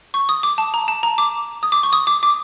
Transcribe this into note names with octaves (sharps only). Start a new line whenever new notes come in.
C#6
D#6
D6
A5
A#5
A5
A#5
D6
D#6
D6
C#6
D#6
D6
D6